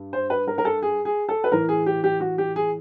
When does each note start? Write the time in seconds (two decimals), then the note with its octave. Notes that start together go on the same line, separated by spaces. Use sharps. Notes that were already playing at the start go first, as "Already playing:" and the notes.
Already playing: G2
0.13 C5
0.30 B4
0.47 A#4
0.58 A#4
0.65 A4
0.82 G#4
1.05 G#4
1.29 A4
1.44 B4
1.52 A2 E3 A#4
1.69 G#4
1.86 G4
2.04 G4
2.20 F#4
2.38 G4
2.56 G#4